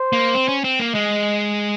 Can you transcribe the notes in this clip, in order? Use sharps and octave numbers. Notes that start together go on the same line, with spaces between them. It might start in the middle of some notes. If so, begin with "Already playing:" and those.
Already playing: C5
A#3
C4
C#4
C4
A#3
G#3 D#5